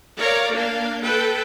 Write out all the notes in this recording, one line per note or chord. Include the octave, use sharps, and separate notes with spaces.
A#4 C#5 D5 F5 A#5
A#3 D4 F5
A4 B4 G5